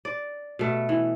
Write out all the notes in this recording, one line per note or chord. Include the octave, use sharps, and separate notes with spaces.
D5
B2 A3
E3